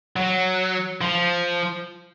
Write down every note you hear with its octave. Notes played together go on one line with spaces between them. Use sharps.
F#3
F3